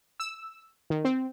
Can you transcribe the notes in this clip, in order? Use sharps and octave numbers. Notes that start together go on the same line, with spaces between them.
E6
D#3
C4